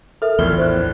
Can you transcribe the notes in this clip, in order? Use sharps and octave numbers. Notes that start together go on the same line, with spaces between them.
A4 A#4 E5 F6
A#1 E2 A2 F6 G7
C5 F#6